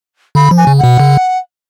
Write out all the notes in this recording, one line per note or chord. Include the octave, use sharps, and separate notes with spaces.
D3 B5
F3
G#5
C#3
F#5
B2
C#3